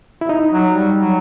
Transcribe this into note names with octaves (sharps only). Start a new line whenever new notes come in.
E4
D#4
F#3
G3
F#3